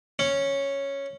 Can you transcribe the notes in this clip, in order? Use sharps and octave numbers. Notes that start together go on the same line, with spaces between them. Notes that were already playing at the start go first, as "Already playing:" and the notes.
C#4